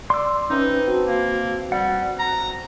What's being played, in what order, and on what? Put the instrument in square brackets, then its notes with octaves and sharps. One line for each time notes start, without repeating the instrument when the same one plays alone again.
[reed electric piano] D5 D6 [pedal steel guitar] C6 E6
[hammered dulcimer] E3 C4 D6 [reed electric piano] C#4 [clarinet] D#4
[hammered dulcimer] C4 A5 [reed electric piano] F#4
[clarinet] A#3
[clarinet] G3 [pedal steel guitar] F#5
[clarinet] A#5